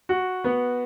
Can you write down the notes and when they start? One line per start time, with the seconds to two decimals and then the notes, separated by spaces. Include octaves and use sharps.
0.09 F#4
0.44 B3